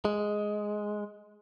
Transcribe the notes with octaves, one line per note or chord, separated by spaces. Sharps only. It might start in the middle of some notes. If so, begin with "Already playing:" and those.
G#3